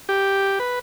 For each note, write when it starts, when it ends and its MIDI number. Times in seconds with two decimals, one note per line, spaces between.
0.09 0.59 67
0.59 0.79 71